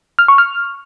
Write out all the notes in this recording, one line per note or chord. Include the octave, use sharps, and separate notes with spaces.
F6
C#6
F6